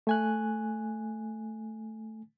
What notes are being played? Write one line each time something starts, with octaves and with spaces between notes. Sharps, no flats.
A3 G#5 F#6